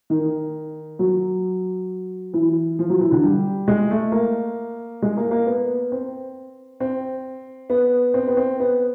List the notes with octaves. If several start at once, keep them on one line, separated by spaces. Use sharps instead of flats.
D#3
F#3
E3
F3
F#3
E3
D3
G3
G#3
A3
A#3
G#3
A#3
A#3
B3
C4
C4
B3
C4
B3
C4
B3